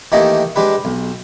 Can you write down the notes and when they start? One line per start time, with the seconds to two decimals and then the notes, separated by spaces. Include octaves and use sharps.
0.12 D#3 E3 A3 A#3 G4 D#5
0.56 G#3 D4 G4 B4
0.85 B1